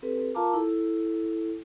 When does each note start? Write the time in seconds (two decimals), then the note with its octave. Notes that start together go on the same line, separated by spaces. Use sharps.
0.02 C4 G4 A4 B4
0.35 F4 A#4 F5 A5 A#5 D6
0.54 E4 A4